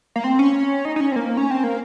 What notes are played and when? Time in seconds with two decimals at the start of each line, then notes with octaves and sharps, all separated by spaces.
0.16 A#3
0.24 C4
0.39 C#4
0.85 D#4
0.96 D#4
1.00 C#4
1.12 C4
1.16 A#3
1.37 C#4
1.51 C4
1.64 A#3